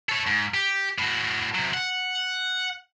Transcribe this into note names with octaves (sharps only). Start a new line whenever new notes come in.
A4 C#5
G#2
G4
A2 F#4
C3 F#3
F#5